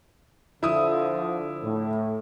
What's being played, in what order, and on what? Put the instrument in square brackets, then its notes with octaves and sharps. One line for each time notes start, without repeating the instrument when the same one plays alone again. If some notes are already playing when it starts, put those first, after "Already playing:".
[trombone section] D3 F3 [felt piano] E4 D#6
[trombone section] A2